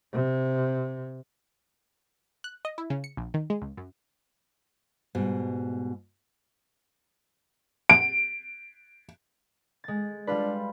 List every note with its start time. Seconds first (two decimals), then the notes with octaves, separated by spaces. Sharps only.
0.13 C3
2.44 F#6
2.65 D#5
2.78 E4
2.90 C#3
3.04 C#7
3.17 A#1
3.34 D#3
3.50 G#3
3.62 C#2
3.77 F#2
5.15 G#2 B2 G3
7.89 D7
9.84 G#3 A6
10.27 G3 D4 F4 B4